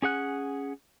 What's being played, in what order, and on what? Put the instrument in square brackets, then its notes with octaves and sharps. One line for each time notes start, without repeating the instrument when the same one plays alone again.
[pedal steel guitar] C#4 G#4 F#5 F#6